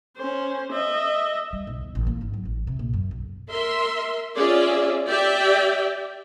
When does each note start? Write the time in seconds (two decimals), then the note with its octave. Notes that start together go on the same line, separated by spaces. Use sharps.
0.17 C#4 C5
0.73 D#5 E5
1.53 G3
1.67 B1
1.81 E2
1.95 A1
2.07 A#3
2.21 G#1
2.34 F#3
2.45 A1
2.67 C3
2.79 A#1
2.93 F#2
3.11 B1
3.48 A#4 E5 C6
4.35 C#4 F4 G#4 D5 E5
5.08 G4 D5 E5 G5